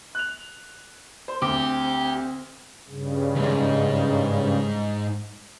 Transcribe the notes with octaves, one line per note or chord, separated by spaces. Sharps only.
F#6 F7
C5
D2 C4 G4 D6
G2 C#3
D#2 G#2